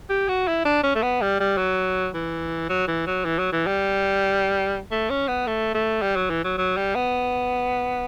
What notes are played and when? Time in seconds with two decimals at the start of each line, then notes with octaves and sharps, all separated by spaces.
0.10 G4
0.29 F#4
0.47 E4
0.65 D4
0.83 C#4
0.95 A3
1.02 B3
1.21 G3
1.40 G3
1.57 F#3
2.14 E3
2.69 F#3
2.88 E3
3.07 F#3
3.25 E3
3.38 F#3
3.53 E3
3.67 G3
4.92 A3
5.10 C#4
5.28 B3
5.47 A3
5.74 A3
6.02 G3
6.16 F#3
6.30 E3
6.44 F#3
6.58 F#3
6.77 G3
6.95 B3